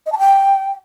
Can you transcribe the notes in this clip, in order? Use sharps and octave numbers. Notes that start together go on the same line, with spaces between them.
D#5
A5
G5